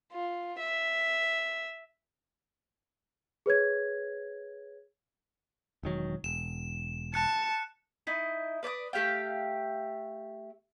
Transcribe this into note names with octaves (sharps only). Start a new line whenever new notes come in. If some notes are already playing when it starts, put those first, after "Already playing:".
F4
E5
G#4 B4 C#5 G#6
E1 D#3 F#3
E1 E7
A5 F#6 C#7
D#4 E4 D#5
B4 D5 G5 D#6
A3 G4 F5 G5